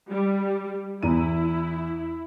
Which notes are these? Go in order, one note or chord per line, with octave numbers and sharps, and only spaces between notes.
G3
E2 E4 A#5 D#7